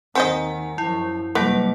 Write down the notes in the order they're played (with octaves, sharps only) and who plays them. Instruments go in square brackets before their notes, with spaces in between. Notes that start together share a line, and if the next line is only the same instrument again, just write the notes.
[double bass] D#2 D#3 [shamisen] C4 C5 D#5 [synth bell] F#5 G#5
[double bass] F#2 F3 [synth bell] E4
[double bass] F1 G3 [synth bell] F#3 A#3 F#5 [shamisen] B4